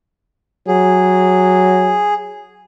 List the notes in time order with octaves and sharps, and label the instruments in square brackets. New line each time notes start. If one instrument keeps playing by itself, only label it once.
[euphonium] F#3 [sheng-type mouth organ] G#4